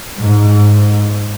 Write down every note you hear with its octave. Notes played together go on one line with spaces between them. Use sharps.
G#2